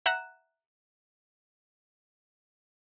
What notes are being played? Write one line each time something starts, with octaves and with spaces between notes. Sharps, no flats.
E5 F#5 A#5 F#6 E7